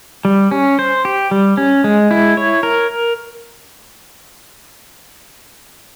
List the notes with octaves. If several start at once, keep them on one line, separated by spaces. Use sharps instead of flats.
G3
C#4
C5
G4
G3
C#4
G#3
E4
C#5
A#4